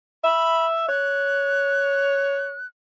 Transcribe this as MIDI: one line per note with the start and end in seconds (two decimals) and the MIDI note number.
0.24 0.84 76
0.24 0.65 83
0.88 2.56 73
0.88 2.67 90